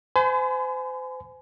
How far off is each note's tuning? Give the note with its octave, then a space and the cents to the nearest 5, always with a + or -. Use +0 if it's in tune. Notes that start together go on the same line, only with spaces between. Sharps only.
C5 -35 G#5 +20 B5 +45